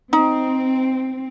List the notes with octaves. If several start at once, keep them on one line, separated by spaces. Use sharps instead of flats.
C4 D#4